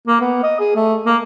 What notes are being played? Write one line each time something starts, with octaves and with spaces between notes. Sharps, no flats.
A#3
B3
D#5
G#4
A3
A#3